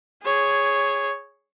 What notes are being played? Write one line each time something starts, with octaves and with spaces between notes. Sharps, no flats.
G#4 C#5